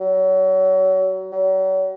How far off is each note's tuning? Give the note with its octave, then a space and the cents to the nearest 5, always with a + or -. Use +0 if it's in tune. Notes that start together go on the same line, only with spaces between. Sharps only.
F#3 +30
F#3 +40